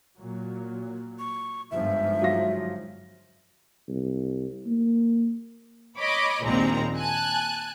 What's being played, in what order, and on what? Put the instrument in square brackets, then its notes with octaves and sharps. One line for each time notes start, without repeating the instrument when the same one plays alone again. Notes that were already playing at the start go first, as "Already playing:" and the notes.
[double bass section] A#2 F#3
[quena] C#6
[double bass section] G1 G#2 F3 [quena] E5
[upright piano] F#3 F4 A#6
[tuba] C2
A#3
[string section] C#5 D#5 B5 D6
A#1 D#2 A#2 G#3 C4 A#5
G#5 A5 F#6